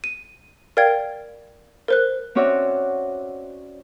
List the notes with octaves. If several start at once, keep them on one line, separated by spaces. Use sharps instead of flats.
D#7
A#4 D5 F5 G5 G#6
A#4 C5 F#6
C4 C#4 F#4 C#5 D5 E5